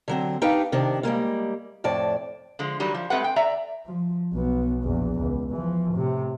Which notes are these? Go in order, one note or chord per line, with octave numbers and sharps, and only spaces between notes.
D3 F#3 C4
D4 D#4 G4 B4 F5 G5
C3 D#3 D4
G3 G#3 A#3 F4
F2 A2 D5 A5
D3 F3 G#3
D#3 F#3 G3
F3
G#3 A3 C4 G4 B4 F#5
G5
D5 E5 A#5
F3
B1 B3
A#1 E2
C#2
E3 F3
A2 C3